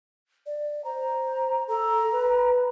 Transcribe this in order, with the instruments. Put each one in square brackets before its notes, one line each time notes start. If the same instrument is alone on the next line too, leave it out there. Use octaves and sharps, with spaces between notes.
[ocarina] D5
[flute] C5 [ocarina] A#5
[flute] A4 [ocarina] A#5
[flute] B4